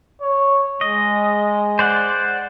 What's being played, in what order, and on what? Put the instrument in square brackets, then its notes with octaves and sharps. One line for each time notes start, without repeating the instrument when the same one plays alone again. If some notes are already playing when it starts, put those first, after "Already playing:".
[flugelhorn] C#5
[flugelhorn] G#3 [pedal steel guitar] D#5
[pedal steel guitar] C5 D5 F#5